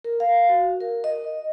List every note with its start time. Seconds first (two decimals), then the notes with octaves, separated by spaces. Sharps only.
0.04 A#4
0.20 F5
0.49 F#4
0.81 A#4
1.04 D#5